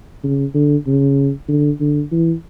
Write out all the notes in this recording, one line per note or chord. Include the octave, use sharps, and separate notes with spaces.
C#3
D3
C#3
D3
D3
E3